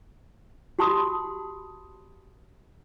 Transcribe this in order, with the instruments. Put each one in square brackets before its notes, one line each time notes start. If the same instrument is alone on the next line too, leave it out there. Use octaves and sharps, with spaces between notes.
[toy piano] F#4 G4 A5 B5 C6 D#6